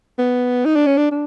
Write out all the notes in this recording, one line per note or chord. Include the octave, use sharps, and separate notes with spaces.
B3
D#4
D4
C#4
D4
D4